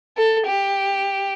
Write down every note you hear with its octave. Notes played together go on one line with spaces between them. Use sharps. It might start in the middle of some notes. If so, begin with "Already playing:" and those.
A4
G4